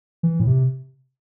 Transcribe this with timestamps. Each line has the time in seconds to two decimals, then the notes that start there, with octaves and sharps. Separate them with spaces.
0.23 E3
0.40 A2
0.47 C3